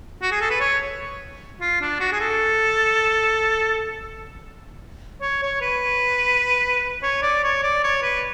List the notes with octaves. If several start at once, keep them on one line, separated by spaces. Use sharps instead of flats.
F#4
G#4
A4
B4
C#5
F4
D4
F#4
G#4
A4
C#5
C#5
B4
C#5
D5
C#5
D5
C#5
B4